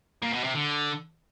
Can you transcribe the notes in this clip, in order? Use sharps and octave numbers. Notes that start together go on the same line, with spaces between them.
A#2
B2
C3
D3